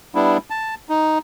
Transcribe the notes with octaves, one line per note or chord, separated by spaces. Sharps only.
G3 B3 D4 E4
A5
D#4